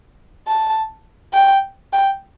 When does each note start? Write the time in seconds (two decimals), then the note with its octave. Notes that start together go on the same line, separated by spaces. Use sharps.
0.47 A5
1.34 G5
1.93 G5